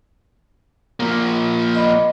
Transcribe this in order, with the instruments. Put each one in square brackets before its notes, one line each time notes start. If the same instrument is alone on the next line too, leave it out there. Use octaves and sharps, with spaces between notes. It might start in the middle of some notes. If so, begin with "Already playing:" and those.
[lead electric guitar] F3 A#3
[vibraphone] D#5 B5